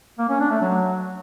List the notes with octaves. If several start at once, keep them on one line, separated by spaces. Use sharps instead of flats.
A#3
C#4
D4
A3
F#3